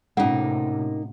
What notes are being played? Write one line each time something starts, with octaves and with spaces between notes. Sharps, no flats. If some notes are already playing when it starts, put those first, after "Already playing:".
A2 C3 A#3 C#4 D#4 F4 F#5